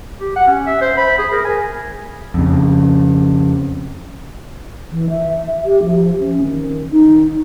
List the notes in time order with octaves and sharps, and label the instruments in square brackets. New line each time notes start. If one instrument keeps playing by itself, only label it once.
[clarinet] G4
F#5
C#4
E5
C5
B5
G#4
A#4
G#5
[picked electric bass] F2 C#3
[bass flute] E3
E5
G4
F3
C#4
D#3
D#4